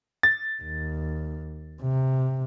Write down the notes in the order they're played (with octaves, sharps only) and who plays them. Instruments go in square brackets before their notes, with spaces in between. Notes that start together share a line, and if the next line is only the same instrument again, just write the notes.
[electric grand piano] A6
[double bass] D#2
C3